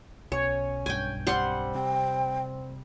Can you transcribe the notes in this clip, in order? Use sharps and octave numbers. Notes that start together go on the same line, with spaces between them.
B1 C#4 C#5
B1 G2 G5 G#5
G3 C4 F#5 C6
C3 G5